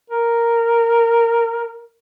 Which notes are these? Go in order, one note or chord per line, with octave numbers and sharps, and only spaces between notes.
A#4